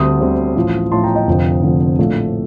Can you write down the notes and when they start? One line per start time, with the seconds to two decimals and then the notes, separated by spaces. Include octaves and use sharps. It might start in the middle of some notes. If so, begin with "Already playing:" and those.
Already playing: D2 D3 G3 C4 C6 D#6
0.20 D2 D3 G3 C4
0.56 A1 A2 F3
0.91 A1 A2 F3 A5 C6
1.04 G5 A#5
1.15 D#5 G5
1.27 F1 F2 D3
1.63 F1 F2 D3
1.98 A#1 A2 A3 D4